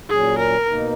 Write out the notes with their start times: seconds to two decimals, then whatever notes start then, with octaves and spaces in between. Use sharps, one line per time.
0.09 A#2 F#3 C#4 G#4
0.38 A#4
0.68 B2 A#3 D#4